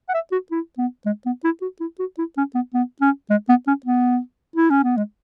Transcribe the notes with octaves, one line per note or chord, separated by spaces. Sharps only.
F#5
E5
F#4
E4
B3
G#3
B3
E4
F#4
E4
F#4
E4
C#4
B3
B3
C#4
G#3
B3
C#4
B3
E4
C#4
B3
G#3